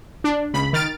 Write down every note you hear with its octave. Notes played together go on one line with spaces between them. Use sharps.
D4
C#2 B5
D#3 F6 A6 D7